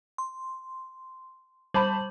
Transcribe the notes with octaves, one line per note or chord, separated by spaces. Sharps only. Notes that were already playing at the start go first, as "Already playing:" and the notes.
C6
G3 C5 A5 B5 F#7